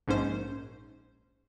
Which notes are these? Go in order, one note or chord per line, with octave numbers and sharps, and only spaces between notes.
A#1 G#2 C#4 C5